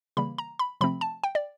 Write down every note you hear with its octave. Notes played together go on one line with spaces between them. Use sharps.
C#3 E3 G3 A#3 B5
A#5
B5
C3 F3 A3 C4 B5
A5
G5
D5